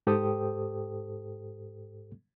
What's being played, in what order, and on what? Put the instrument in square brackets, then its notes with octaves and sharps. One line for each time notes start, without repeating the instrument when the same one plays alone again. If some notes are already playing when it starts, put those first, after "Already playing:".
[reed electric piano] G#2 G4 A4 C5 G5 D#6